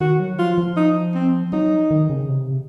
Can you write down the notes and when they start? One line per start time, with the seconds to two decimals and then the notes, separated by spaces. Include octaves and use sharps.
0.01 D#3 F#4
0.20 F#3
0.38 F3 F4
0.58 F3
0.76 D#4
1.15 C4
1.53 F#3 D#4
1.91 D#3
2.10 C#3
2.28 C3